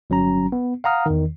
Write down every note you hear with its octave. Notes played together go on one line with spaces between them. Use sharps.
G1 F#3 C#4 A#5
B3
F5 F#5 A#5 D#6 F6
E2 D#3